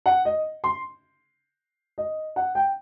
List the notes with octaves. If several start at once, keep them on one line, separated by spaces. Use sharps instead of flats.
F#5
D#5
C6
D#5
F#5
G5